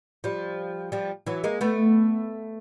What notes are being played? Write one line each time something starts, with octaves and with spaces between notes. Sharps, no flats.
F3 G3
F3 G3
E3 F#3
G#3 A#3
A3 B3